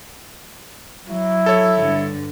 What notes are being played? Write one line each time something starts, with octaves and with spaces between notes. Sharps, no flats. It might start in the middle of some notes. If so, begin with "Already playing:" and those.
F#3 E4
A4 C#5
G2 D3